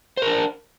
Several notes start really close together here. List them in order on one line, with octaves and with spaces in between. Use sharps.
C5 A#4 D4